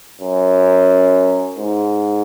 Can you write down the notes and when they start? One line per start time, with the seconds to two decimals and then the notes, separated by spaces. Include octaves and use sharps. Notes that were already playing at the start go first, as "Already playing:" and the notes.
0.21 F#2
1.58 G#2